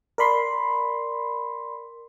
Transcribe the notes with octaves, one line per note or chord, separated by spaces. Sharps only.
A#4 D5 B5 C6